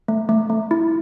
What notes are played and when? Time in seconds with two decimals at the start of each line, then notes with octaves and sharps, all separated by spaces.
0.08 A3
0.29 A3
0.50 A3
0.71 E4